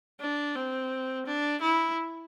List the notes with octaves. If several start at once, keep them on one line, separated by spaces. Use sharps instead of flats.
D4
C4
D4
E4